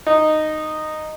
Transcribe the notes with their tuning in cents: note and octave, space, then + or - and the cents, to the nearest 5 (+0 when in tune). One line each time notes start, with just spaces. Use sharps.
D#4 -10